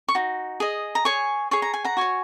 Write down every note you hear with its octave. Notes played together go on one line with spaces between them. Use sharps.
C#6
D#4 F#4
G#4 D#5
A#5
G#4 C#5 G#5 C#6
G#4 C#5 C#6
A#5
G#5
F#5 A#5
F#4 C#5 G#5 C#6